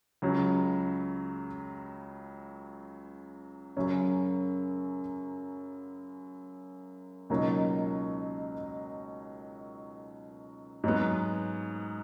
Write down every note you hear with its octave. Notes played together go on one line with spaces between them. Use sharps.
C#2 C#3 F#3
F#2 C#3 F#3 C#4
C#2 B2 F#3 A#3 D#4
G#2 F#3 B3